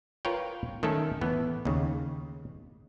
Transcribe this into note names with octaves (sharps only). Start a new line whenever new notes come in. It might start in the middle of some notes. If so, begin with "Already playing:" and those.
F4 A#4 B4 C#5 G5
D#3 A3 C#4 A4
A2 E3 B3
D#2 C#3